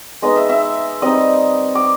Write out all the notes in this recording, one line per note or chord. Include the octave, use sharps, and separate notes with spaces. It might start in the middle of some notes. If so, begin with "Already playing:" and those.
G#3 B3 D#4 D#5 D#6
E5 E6
E5 E6
G3 C4 D#4 D#5 D#6
D6